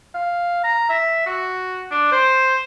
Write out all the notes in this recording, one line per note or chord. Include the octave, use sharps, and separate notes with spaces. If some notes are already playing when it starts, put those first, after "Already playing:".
F5
A#5
E5
F#4
D4
C5